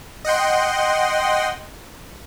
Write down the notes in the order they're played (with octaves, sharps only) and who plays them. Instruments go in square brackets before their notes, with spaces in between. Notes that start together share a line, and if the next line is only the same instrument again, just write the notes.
[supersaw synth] D#5 F#5 G5 C6